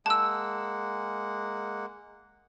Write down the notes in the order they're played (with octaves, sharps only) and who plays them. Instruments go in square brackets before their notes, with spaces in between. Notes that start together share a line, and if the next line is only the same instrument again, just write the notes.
[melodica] G#3 A#3 F#5 [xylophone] A5 E6